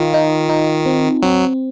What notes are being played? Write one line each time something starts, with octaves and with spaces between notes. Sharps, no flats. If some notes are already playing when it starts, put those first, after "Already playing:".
Already playing: D#3 F4
D#4
D#4
C4
F#3 C4